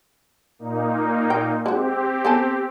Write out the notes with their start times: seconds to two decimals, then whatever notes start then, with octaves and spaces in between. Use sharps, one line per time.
0.59 A#2 A#3 D#4
1.30 G5
1.66 G#3 C4 F#4 G4
2.25 B3 A4 G#5